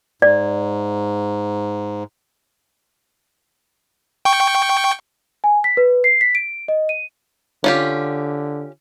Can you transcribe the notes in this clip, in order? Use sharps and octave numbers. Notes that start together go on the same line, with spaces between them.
G#2 D5
G5 C#6
G#5
B6
B4
C7
B6
D7
D#5
D#7
D3 C#4 F4 G4